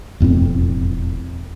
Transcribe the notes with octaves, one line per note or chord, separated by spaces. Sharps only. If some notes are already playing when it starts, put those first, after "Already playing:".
E1 F2 A2 C4